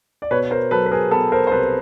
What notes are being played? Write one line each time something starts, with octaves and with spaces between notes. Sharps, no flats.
D5
B2 B4 C#5
A#4 C5
F#3 A4 B4
B4
G#4 A#4
B3 A4 B4
A#4 C5
C5
C2 A4 B4